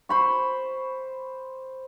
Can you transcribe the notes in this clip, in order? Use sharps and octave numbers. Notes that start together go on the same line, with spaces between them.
C5 B5 C#6